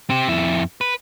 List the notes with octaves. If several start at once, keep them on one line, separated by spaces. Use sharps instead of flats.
C4 G4
F2 E4
B4